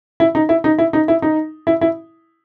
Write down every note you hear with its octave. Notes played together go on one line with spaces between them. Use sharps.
E4
D#4
E4
D#4
E4
D#4
E4
D#4
E4
E4